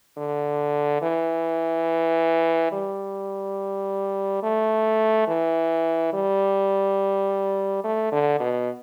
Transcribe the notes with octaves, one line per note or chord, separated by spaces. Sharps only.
D3
E3
G3
A3
E3
G3
A3
D3
B2